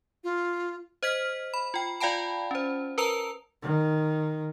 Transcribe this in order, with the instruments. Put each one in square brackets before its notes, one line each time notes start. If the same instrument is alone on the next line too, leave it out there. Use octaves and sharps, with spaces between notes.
[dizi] F4
[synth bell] C5 D#5 F6 B6
B5
F4 G5
F4 D5 F5 G5 A5 B5
C#4 C5
A#4 B4 A5 A#5 E6 F7
[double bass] D#3